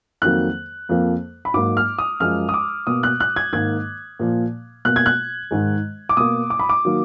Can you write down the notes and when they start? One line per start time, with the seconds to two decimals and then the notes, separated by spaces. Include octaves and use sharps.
0.22 F2 D#3 F#3 A#3 F#6
0.89 F2 F3 A#3
1.45 B5
1.54 G#2 F#3 A#3 D6
1.77 F6
1.99 D#6
2.20 F#2 F3 G#3 F6
2.49 D#6
2.54 D6
2.87 B2 A#3 D#6
3.03 F#6
3.20 F#6
3.36 G#6
3.53 G#2 D#3 A#3 G#6
4.20 A#2 F3 A#3
4.85 B2 A#3 F#6
4.96 G#6
5.06 F#6
5.51 G#2 D#3 G#3
6.09 D6
6.17 B2 A#3 D#6
6.50 D6
6.59 B5
6.69 D6
6.85 D#3 F#3 A#3